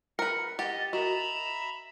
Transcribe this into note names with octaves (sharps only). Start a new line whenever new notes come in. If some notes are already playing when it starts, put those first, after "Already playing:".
A#4 B4 C#7
G4 D#5 F#5 A6
F#4 A#4 D#5 E5 A#5 B5 E7